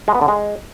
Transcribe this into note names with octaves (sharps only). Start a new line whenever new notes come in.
G#3
B3
D3
G#3